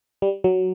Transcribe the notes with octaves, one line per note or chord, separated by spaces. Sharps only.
G3
F#3